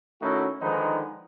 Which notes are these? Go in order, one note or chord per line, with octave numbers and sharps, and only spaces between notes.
D#3 A3 C#4 E4 F#4
D3 D#3 F3 G#3 D#4 B4